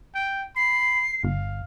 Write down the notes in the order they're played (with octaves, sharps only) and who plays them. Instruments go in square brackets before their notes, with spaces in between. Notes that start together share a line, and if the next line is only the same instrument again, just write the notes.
[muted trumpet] G5
[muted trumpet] B5 [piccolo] C7
[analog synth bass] G1 [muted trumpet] F5